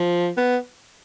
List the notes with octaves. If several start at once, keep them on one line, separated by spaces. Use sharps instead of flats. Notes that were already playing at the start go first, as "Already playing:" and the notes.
Already playing: F3
B3